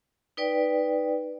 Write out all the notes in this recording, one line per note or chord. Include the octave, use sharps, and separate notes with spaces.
D#4 B4 D5 G5